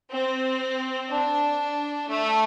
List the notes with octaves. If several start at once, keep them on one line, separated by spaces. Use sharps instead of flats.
C4
D4
A3